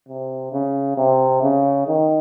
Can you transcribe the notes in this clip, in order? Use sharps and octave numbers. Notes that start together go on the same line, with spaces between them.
C3
C#3
C3
C#3
D#3